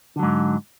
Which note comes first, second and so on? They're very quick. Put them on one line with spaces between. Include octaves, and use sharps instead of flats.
D3 F#3 G#2